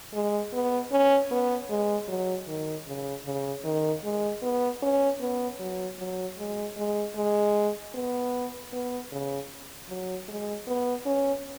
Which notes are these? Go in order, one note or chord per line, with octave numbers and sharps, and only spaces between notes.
G#3
B3
C#4
B3
G#3
F#3
D#3
C#3
C#3
D#3
G#3
B3
C#4
B3
F#3
F#3
G#3
G#3
G#3
B3
B3
C#3
F#3
G#3
B3
C#4